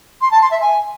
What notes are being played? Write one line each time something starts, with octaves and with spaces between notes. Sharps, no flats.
C6
A5
C6
E5
G#5